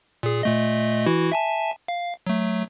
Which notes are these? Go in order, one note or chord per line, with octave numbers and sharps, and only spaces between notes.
A#2 G#4
A#2 A3 D#5
E3 E4 F#4
E5 G#5 A5
F5
F#3 A3